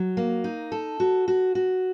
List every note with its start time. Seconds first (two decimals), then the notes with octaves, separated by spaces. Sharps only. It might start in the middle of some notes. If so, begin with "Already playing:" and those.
Already playing: F#3
0.17 A#3
0.44 D#4
0.72 A4
1.00 F#4
1.28 F#4
1.55 F#4